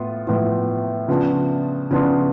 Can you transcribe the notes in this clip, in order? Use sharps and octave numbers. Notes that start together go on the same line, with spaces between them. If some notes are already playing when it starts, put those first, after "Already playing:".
Already playing: A2 B3 F4
A2 F3 B3 F4
C#3 F3 B3 D4 F4
C#3 F3 B3 D4 F4